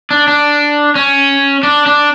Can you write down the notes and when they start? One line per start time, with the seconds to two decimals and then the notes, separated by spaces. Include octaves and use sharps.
0.11 D4
0.28 D4
0.95 C#4
1.63 D4
1.86 D4